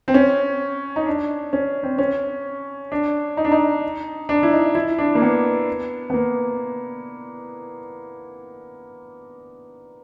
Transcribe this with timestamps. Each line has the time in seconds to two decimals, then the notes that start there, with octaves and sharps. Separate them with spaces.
0.08 C4
0.14 C#4
0.96 D#4
1.06 D4
1.53 C#4
1.83 C4
1.98 C#4
2.92 D4
3.37 D#4
3.45 D4
3.52 D#4
4.29 D4
4.43 E4
4.53 D#4
4.75 E4
4.99 D4
5.15 A#3
5.22 B3
6.10 B3
6.14 A#3